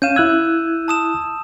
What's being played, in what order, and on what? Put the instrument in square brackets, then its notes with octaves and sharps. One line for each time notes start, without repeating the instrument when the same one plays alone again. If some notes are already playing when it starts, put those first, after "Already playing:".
[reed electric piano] C#4 F5 [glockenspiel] G6 D#7 E7
[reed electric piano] E4 F#6 G#6 [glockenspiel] E6
[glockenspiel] A5 D#6 E7